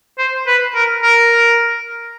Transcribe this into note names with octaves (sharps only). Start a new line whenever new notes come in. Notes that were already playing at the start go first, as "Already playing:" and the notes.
C5
B4
A#4
A#4